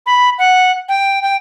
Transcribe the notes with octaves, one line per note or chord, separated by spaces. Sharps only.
B5
F#5
G5
G5